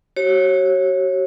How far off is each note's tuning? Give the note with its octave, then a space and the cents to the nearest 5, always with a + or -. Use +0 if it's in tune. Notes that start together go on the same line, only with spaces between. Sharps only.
F#4 +40 C#5 -25